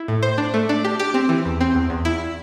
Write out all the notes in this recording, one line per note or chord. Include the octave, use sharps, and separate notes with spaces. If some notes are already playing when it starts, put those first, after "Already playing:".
Already playing: E4
A2
C5
D4
A3
D4
G4
G4
C4
E3
E2
C4
E2
E2
E4